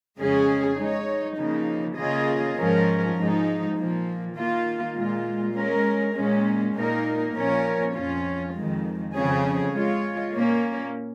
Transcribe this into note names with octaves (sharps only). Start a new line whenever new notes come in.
F2 C#3 G#3 C#4 G#4
G#3 D#4 C#5
C#3 F3 A#3 D#4
C#3 A#3 F4 G#4 D#5
G#2 F3 C#4 A#4
G#2 F3 G#3 D#4
A#2 F3 A#3
D#3 A#3 F4
A#2 G#3 F4
G#3 C#4 A#4
A#2 G#3 C#4
A#2 A#3 D#4 A#4
A#2 F3 C#4 A#4 C#5
F2 F3 C#4 F4
F2 D#3 G#3
F2 C#3 F3 C#4 G#4
G#3 F4 C#5
A#2 A#3 C#4